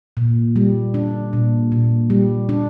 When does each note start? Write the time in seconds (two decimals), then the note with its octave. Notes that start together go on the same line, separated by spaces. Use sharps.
0.17 A#2
0.56 G3
0.94 D4
1.33 A#2
1.72 A#2
2.10 G3
2.49 D4